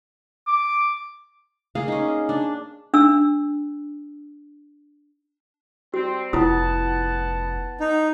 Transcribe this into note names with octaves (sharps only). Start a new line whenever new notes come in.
D6
A#3 G#4 F5
C#4 D#4
D4
D4 E6
G3 C4 F#4
F1 B3 E4 F4 F#5 A5 D#6
D#4